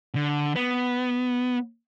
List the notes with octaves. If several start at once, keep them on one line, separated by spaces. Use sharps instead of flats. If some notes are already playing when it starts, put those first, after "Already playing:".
D3
B3